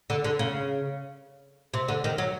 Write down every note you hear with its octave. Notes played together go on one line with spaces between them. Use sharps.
D3
D3
C#3
C3
D3
D#3
F#3